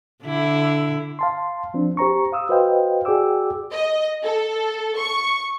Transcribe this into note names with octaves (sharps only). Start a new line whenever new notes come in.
D3 E4
F5 A5 C6
F3 C4 D4
G4 C5 A#5 C#6
F5 D#6 E6
F#4 B4 C5 D#5 F5 G5
F#4 G#4 D5 G5 D6 E6
D#5
A4
C#6